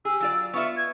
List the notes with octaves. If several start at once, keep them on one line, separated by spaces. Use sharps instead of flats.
G4 G#4 E6
F#3 F4 D5
B3 F4 E5 C#6
G#6